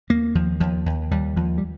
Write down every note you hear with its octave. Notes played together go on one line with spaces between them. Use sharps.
D#2 A#3
D#2 F3
D#2 F3
D#2
D#2 G3
D#2 F3
G3